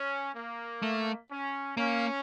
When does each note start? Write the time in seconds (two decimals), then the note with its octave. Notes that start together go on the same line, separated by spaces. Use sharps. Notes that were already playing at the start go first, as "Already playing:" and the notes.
Already playing: C#4
0.35 A#3
0.82 A3
1.30 C#4
1.77 A#3 C#4